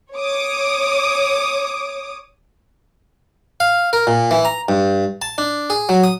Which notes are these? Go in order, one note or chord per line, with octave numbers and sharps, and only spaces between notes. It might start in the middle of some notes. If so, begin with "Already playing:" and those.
C#5 D6 D#6
F5
A#4
A#2
E3
A#5
G2
A5
D4
G#4
F#3
D#6